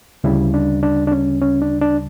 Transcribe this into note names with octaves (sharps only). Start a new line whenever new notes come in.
D2 C#3 G3 E4
D4
D4
D4
C#4
C#4
D4
D4